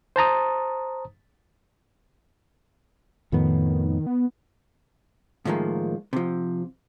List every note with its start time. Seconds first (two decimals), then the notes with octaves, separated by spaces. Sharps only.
0.16 C5 A5 A#5 D#6
3.32 F2 A2 D#3 B3
4.07 B3
5.45 A2 D#3 F3 G#3 A#3
6.13 C3 F3